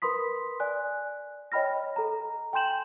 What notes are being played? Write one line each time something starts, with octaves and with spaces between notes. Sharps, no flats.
A#4 B4 B5 C6 D#6 B6
D5 G#5 F#6
C#5 D#5 G5 B5 F6 A#6
A4 A#5
G5 G#5 C6 G6 E7 F#7